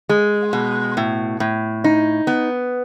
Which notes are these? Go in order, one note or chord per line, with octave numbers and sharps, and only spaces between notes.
G#3
B2
A2
A2
D#4
B3